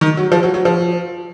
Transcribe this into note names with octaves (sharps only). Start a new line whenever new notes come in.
D#3
F#3
F3
F#3
F#3
F3